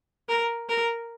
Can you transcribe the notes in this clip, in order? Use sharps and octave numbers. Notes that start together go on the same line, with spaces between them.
A#4
A#4